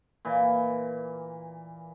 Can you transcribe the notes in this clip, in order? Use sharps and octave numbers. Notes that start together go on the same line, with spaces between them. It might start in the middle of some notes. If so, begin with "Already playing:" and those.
A#2 E3